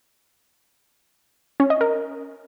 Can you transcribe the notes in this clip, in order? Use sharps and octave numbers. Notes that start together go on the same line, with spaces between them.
C#4
D#5
A#4